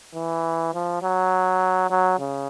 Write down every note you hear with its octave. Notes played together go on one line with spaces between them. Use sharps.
E3
F3
F#3
F#3
C#3